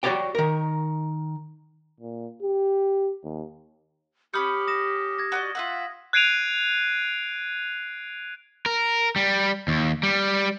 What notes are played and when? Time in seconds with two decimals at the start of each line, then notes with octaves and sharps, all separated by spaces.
0.03 F#4 G4 A4 C#5 D5 G5
0.35 D#3 A#4
2.00 A#2
2.43 G4
3.24 D#2
4.34 C#4 G4 B5 D#6 F6 G6 C#7
4.67 D#6 A#6 E7
5.19 G#6 A#6
5.32 F#4 D5 D#5
5.55 F4 E5 F#5
6.13 F#6 G#6 C7 D7 D#7 F7
8.66 A#4
9.16 G3
9.68 D#2
10.03 G3